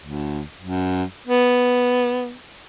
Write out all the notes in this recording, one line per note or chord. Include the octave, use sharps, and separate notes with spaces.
D2
F#2
B3